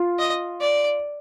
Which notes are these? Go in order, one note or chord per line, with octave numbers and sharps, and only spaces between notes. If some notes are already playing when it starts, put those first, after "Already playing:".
Already playing: F4
D#5
D5